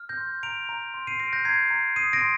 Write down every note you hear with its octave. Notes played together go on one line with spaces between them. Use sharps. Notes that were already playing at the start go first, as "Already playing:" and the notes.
Already playing: F6
G6 A#6
C6
A#5 D7 F7
A#5
C6
C7 D#7
F6 A#6 D7
G6 A#6
A#5 G#6 C7
A#5
D#6 C7 D#7
A#6 D7
C6